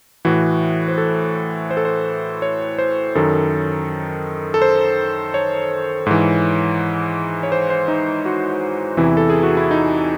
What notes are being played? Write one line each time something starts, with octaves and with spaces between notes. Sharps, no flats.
A2 E3 F#4
C5
A4
C5
A4
C5
C#5
C5
F#2 D#3 A4
A4
C5
C#5
G#2 E3
C#5
C5
C5
D#4
F#4
E2 C3 E3 E4
A4
G#4
F#4
E4
D#4